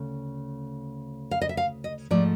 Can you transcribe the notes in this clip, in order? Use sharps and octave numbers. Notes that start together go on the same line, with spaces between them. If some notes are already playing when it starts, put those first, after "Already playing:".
Already playing: D2 C#3 A3
F5
D#5
E5
F5
D#5
G#2 F3 A3 D5